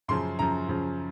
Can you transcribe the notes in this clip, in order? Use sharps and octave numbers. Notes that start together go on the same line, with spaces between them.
F#2 C#3 F3 C6
F#2 C#3 F3 A#5
F#2 C#3 F3